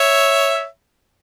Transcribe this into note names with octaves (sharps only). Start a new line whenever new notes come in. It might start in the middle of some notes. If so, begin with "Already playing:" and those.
Already playing: C#5 E5